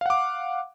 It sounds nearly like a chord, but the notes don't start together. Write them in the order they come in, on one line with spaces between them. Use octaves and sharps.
F5 F#5 D6